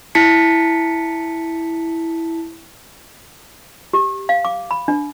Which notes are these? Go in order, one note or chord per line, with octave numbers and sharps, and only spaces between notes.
E4 A5 B6 C#7
G4
F5
D6
B5
D4